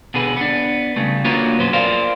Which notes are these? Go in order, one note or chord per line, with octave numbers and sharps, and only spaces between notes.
B2 D3 G#4 B4
B3 D4
C#3 G3 A3
A#3 D4 F4 F#4 B4 C#5
F#2 B2 B4 C5
F4 A#4 C5 D5 F5